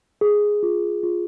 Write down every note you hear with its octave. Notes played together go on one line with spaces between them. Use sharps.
G#4
F4
F4